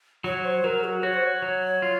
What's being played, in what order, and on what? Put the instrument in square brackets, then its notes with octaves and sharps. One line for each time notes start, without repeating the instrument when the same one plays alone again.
[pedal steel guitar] F#3 [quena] C#5
[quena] C5
[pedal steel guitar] F#3 [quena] A#4
[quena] F#4
[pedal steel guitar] F#4 [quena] C#5
[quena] C5
C#5
[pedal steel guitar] F#3
F4